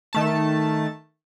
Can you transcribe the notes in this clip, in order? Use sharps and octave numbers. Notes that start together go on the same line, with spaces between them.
D#3 A3 A5